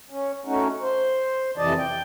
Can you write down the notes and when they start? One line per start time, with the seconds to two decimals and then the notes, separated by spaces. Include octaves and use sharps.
0.10 C#4
0.45 A3 C#4 D#4 F#4
0.81 C5
1.57 F2 C3 E3 D5 D#5 A5
1.78 G5